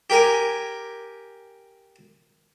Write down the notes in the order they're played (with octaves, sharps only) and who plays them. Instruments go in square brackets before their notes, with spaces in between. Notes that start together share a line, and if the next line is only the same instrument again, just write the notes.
[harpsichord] G4 A#4 G#5